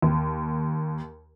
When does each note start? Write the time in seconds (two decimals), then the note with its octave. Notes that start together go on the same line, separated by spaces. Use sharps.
0.02 D#2